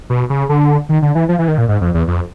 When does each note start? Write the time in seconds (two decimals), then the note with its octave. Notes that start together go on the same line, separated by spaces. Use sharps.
0.10 B2
0.30 C#3
0.49 D3
0.89 D#3
1.02 D3
1.15 E3
1.29 F3
1.39 E3
1.48 D#3
1.58 A#2
1.68 G#2
1.81 F2
1.94 E2
2.08 F2